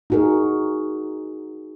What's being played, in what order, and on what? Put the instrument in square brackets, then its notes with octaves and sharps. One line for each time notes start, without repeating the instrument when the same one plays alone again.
[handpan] D#4 E4 F#4 G#4 A#4